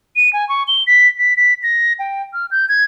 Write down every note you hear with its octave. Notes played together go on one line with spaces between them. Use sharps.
D#7
G#5
C#6
G7
B6
B6
B6
A#6
G5
F6
G6
G#6